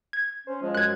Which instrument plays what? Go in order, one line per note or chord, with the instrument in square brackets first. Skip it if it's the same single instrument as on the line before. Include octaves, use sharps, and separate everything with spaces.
[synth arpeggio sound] G#6
[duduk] C#4 [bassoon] C5
[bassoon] F3 [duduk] G#3
[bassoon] F#2 [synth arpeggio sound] F#6 G#6